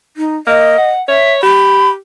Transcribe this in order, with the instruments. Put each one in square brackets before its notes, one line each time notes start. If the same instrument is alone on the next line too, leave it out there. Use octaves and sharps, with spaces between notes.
[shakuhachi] D#4
[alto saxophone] A#3 [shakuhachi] D#5
[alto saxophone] F#5
[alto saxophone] C#5 [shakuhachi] E5
[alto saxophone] G4 [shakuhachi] B5